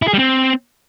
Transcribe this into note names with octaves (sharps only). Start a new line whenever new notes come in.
E4
G#4
G3
C4